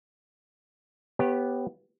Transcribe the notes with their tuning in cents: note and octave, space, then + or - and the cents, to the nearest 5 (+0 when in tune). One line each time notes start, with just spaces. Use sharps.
B3 +0 G4 +0 C#5 -30